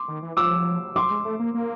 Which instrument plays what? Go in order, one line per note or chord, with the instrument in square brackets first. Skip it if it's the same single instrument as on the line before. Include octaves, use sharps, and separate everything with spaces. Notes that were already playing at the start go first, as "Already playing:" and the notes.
Already playing: [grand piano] C6 D6
[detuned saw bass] D#3
E3
[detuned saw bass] F3 [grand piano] D6 E6
[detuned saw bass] F#3 [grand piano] C6 D6
[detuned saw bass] G#3
A3
A#3
A#3